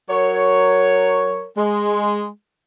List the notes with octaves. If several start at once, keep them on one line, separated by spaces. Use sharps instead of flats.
F#3 A#4 C#5
G#3